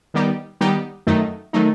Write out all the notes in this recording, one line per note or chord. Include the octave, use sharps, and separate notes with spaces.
D#3 G3 B3 D#4 G4
D#3 G3 B3 D#4 G4
F#2 D#3 F#3 A3 D#4
D#3 F#3 A3 D#4